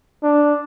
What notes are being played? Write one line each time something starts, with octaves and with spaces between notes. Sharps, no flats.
D4